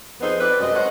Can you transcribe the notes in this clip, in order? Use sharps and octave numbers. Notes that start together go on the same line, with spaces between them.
F2 B3 D#4 G#4 A4 C5
C4 F4 B4 D5
F#2 C3 G#3 C4 D#5
A4 C5 C#5 D#5 F#5